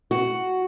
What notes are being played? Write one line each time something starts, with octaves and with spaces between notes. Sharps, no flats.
F#4